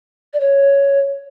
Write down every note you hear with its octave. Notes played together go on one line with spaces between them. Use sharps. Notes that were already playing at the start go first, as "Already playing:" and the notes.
D5
C#5